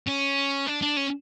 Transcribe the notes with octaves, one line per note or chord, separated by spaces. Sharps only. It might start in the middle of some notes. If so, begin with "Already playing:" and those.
C#4
D4
D4
C#4